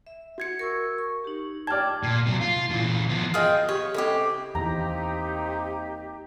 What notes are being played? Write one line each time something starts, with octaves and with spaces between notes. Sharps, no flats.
E5
F#4 G#6 C#7
A#4 C#6 E6 C#7
C#6
D#4 G4
D5 G5 A5 F6 G#6
A#2
C3 F#3
F4
A#2 E3
F3 B3
F4 F#4 G#4 D#5 E5 G5 F6
B3 G4 C#5
C#3 G#3 C4 E4 G4 A4
E2 E3 A#3 C4 D#4 G4 A#5